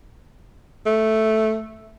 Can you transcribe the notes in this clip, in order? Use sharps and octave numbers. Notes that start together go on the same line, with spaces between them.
A3